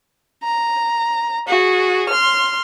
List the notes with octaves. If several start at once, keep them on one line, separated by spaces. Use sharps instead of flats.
A#5
F#4 G#4
C6 F6